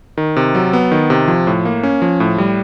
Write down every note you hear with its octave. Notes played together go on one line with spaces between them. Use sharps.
D#3
C3
F#3
B3
D#3
C3
F3
A2
A#3
C#4
F3
A2
G3